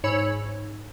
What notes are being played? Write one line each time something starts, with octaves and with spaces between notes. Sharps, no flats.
G#2 C#5 B5 E6